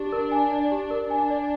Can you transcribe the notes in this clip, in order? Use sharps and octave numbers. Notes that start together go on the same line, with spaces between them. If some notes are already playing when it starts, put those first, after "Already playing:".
Already playing: D4 G4
A#4
G#5
D5
G4
A#4
D4 G#5
D5